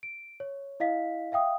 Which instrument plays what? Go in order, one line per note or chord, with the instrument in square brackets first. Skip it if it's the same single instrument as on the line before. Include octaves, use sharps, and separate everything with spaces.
[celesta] D7
C#5
E4 D#5 F5 B6
E5 F5 G5 D#6